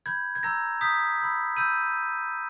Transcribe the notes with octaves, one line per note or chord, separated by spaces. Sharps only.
B5 G6 G#6
G#6
A#5 E6 G6 A#6
A#5 D#6 G6 B6
B5 E6 G6
B5 E6 G6 D#7